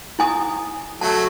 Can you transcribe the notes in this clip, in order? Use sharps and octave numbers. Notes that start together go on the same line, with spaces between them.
E4 G#5 D#6
F#3 A3 A5